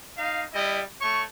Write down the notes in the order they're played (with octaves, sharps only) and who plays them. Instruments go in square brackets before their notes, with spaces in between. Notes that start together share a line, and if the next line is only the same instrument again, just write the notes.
[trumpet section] D#4 F5
G3 E4 D#5
A3 C#5 C#6